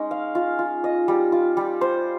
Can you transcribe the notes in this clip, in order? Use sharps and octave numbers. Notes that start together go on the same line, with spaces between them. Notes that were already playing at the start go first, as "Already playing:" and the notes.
Already playing: G#3 C#4 D#4
F5
F4
F4
D#5
G3
F4
G3
C5